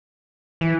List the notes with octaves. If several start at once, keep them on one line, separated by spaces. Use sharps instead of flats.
E3